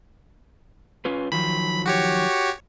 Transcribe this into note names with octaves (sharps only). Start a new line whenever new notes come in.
C#4 F4 B4
D#3 F3 F#3 B5
F#4 G4 C#5